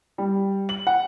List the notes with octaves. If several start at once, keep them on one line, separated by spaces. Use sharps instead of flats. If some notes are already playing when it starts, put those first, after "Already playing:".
G3
F#7
F#5